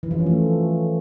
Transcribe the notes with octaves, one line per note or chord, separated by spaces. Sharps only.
E3
F3
C#4
A3